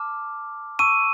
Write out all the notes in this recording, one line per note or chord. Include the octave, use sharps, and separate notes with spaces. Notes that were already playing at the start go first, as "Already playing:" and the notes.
Already playing: A5 D6 F6
A5 C#6 E6 D#7